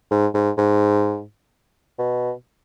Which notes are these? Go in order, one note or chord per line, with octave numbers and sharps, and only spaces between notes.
G#2
G#2
G#2
B2